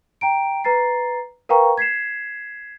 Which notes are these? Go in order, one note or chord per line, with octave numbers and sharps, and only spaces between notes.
G5 A#5 D7
B4 A#5 A6 C7
A#4 B4 F5 G5 A#5 C#6
G#6 B6 C7 E7